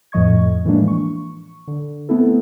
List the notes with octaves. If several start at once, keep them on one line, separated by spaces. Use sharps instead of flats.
F2 A2 F3 D#5 C#6 G#6
A2 E3 F3 G#3 A#3 D4
C#6
D3
A3 B3 C4 E4 A4